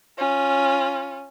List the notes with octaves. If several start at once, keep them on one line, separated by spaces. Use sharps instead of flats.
C#4 F4